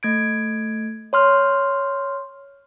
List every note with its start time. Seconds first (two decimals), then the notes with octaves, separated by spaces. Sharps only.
0.03 A3 G#6 D7
1.13 C#5 C6 F6